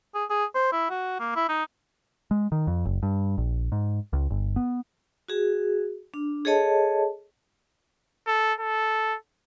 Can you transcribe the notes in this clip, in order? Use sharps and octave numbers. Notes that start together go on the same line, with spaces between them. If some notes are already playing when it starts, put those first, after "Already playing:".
G#4
G#4
C5
E4
F#4
A#3
E4
D#4
G#3
D#3
F2
F#1
G2
A#1
G#2
C#2
G1
B3
F#4 G#4
D4
G#4 A4 C#5 D#5 A5
A4
A4